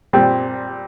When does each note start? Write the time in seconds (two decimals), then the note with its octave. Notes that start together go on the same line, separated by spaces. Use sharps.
0.13 A#2 G3 C4